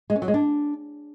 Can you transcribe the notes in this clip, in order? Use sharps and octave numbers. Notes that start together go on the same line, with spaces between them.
G#3
C#4
F#3
G#3
D4